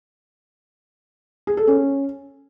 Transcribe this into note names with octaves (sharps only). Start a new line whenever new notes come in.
G#4
A4
C#4